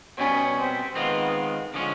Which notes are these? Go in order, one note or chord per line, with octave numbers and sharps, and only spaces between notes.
B2 G3 B3 C#4
C4
D#3 G#3 B3 C4 F4
D3 F3 G#3 C#4